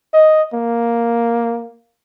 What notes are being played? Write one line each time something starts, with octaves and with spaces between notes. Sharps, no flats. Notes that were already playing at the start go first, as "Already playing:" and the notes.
D#5
A#3